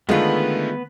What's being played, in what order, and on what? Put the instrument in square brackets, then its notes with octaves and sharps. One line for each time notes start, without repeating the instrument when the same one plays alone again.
[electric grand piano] D3 D#3 A3 [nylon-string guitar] G#3 F4 [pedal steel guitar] B3 B4